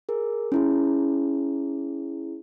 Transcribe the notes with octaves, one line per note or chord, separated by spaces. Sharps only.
G#4 A#4
C#4 E4 G#4